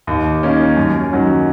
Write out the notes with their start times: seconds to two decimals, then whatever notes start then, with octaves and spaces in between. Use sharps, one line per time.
0.07 D#2
0.43 D#3 A#3 C#4
0.77 F#2
1.12 D#3 F#3 C#4